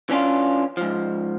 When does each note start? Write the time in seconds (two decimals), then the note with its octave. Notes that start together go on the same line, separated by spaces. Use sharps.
0.10 E3 C#4 D4 F4
0.77 G#2 F3